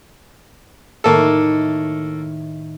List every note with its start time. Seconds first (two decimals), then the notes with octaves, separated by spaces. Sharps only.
1.04 A2 D#3 A#3 A4